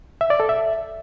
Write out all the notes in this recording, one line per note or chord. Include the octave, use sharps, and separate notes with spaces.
E5
D5
A4
E5